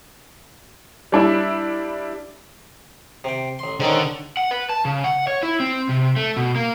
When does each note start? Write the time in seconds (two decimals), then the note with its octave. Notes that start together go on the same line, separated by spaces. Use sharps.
1.12 G3 D4 E4 E5
3.24 C3 G5
3.59 A1 C6
3.80 G#2 D3 D#3 C#4
4.37 F#5
4.51 B4
4.69 A5
4.85 C#3
5.04 F#5
5.27 C#5
5.43 E4
5.60 C4
5.89 C3
6.16 A3
6.36 B2
6.55 A#3